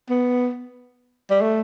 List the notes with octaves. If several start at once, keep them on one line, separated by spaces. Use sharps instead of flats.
B3
G3
A3